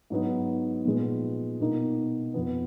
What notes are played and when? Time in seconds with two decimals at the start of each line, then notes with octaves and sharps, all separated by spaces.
0.10 G#2 F#3 B3 D#4
0.85 A#2 F3 G#3 B3
1.60 B2 A#3 D#4
2.34 F2 F3 B3